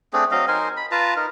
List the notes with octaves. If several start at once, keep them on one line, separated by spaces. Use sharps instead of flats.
A3 C4 D4 G#4
F#3 C4 D#5 F5
D#4 A#4 C5 G#5
B5
F4 B4 A5 A#5
D#4 A#4